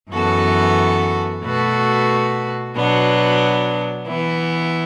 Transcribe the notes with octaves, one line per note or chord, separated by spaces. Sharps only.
F#2 E3 B3 F#4 A4
B2 A3 F#4 B4
B2 F#3 B3 D4
E3 B3 E4